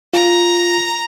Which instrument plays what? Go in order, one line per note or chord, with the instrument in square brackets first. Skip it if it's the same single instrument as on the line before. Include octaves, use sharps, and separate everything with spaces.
[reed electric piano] F4 [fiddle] A#5